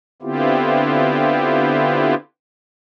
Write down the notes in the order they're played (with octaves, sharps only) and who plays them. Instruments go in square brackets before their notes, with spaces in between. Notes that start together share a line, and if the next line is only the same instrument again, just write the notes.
[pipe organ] D3 B3 C4 E4 F4 G4